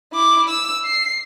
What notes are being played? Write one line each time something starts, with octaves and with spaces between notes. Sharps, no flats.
E4 D6
E6
C7